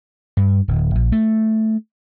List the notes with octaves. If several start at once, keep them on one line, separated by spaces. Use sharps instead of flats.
G2
D1
A#1
A3